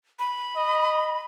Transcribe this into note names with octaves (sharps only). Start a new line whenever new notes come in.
B5
D#5